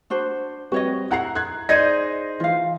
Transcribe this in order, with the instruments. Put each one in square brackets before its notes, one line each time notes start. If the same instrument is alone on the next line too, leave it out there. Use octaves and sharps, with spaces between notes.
[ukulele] D4 F#4 C5
[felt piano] G3 C4 B4 [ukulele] F#4 C#5 D#5
[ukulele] E4 F#5 A#5 [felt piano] F#6 C7
[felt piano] F#6 G#6
[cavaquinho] D#4 G#4 C5 [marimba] D5 D#5 G#6 [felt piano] A#6 D#7
[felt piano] E3 [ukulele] F4 F5